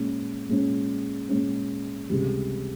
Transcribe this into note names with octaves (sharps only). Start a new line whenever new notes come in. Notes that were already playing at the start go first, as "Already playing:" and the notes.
Already playing: A#2 G#3 C#4
A#2 G#3 C#4
A#2 G#3 C#4
C#2 C3 E3 G3